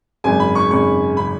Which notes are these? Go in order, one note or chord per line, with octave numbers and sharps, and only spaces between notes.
G#1 F#2 C#3 G#5
B5
C#6
G#1 F#2 C#3 C#6
C#3 B5